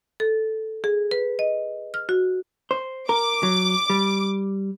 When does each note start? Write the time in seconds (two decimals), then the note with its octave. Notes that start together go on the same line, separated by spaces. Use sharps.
0.20 A4
0.84 G#4
1.11 B4
1.39 D#5
1.94 F6
2.09 F#4
2.71 C5
3.09 A#4 D6
3.43 F#3
3.90 G3